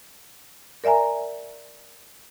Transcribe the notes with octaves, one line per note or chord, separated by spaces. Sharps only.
A#4 D5 E5 G#5 A#5